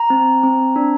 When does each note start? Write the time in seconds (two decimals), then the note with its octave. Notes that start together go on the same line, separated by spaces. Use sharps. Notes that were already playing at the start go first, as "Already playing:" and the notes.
Already playing: A#5
0.10 C4
0.43 C4
0.76 D4